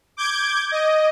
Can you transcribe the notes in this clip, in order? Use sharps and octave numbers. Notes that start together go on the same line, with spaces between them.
D6 G6 G#6 D7
D#5